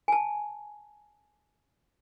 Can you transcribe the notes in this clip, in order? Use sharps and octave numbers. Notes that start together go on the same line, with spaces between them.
G#5 A5